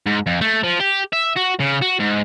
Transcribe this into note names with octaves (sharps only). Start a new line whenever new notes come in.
G#2
F2
A3
F3
G4
E5
F#4
C#3
F#4
G#2